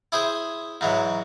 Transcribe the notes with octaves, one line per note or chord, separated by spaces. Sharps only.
E4 G#4 C5
G#2 E3 F#3